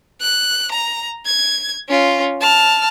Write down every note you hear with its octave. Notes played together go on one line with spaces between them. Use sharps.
F#6
A#5
G#6
C#4 F4
A5 F6